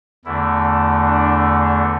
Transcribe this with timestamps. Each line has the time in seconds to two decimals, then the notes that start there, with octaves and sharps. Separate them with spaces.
0.25 E2 D3 A3 E4
1.05 D4